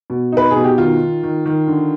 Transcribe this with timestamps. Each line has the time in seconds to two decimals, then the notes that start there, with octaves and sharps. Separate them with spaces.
0.10 B2
0.32 D#4 B4
0.51 B2 G#4
0.64 G4
0.78 D#3 F4
1.00 D#3
1.23 D#3
1.46 D#3
1.68 D3